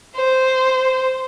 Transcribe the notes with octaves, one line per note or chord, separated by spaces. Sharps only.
C5